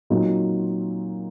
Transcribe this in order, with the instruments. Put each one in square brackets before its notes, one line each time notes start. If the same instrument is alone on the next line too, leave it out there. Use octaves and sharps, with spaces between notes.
[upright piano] A#2 F#3 C4 D#4 F#4